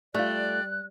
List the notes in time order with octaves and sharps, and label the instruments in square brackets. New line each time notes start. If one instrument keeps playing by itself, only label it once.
[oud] G3 [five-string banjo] A3 F4 [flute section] D5 G5 [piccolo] F#6